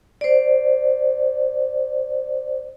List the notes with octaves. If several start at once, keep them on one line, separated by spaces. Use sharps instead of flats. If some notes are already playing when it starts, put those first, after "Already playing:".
C5 D5